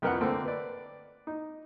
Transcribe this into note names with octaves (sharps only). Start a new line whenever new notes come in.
C2 F2 F3 A#4 B4 F#5
D3 A3 A#3 C4
B4 D5
D#4